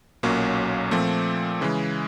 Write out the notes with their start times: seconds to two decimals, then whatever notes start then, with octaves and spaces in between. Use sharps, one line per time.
0.23 B1 A#2 F#3 A#3 C#4
0.91 A#2 F3 A3 C4
1.61 C#3 E3 G#3